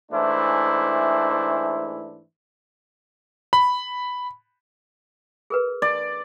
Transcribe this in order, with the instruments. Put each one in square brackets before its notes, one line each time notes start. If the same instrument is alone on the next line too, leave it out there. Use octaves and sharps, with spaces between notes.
[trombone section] G#2 E3 A3 D4 E4 C5
[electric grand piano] B5
[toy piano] G#4 A#4 B4
[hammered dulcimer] D5